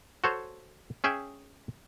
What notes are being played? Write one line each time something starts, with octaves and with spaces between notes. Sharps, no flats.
F#4 A4 C5 C#5
C#4 G#4 E5 G5